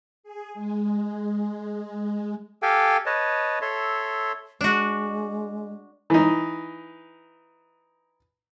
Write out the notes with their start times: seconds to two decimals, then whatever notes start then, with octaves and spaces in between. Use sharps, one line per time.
0.24 G#4
0.54 G#3
2.62 G4 A4 F5 G5 G#5
3.06 B4 C#5 D#5 A5
3.61 A4 C#5 E5 C6
4.61 G#3 D4 F#4
6.10 E3 D#4